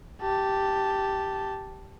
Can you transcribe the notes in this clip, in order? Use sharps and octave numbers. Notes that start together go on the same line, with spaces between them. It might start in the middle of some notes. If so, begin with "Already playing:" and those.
G4 A5